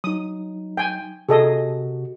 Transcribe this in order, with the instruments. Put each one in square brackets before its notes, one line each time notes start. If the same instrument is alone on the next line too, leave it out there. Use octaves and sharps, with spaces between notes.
[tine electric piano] F#3 D#4 [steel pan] D#6
[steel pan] G5 G#5
[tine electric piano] C3 F#4 [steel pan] G#4 A4 D#5